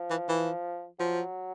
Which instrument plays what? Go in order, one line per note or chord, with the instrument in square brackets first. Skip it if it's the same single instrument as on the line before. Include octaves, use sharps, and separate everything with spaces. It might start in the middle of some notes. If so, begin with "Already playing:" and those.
Already playing: [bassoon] F3
[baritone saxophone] E3
E3
[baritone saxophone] F3 [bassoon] F#3